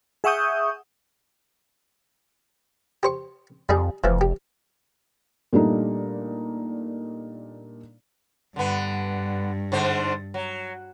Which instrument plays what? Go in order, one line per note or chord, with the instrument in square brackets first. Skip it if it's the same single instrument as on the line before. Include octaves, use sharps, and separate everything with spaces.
[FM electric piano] G#4 E5 F#5 C#6 D#6 G6
[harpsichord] G4 C5 C#6
[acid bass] F2 [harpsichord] G3 D#4 G#4
[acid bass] F1 [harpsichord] E3 F3
[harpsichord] G4
[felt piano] A#2 G3 A3 D4 D#4
[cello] G2 [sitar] D3 B3
[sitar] G#2 D3 C5
F#3